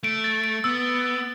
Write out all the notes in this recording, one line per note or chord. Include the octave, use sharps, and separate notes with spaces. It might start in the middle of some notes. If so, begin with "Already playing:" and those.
A3 D7
A6
D7
B3 E6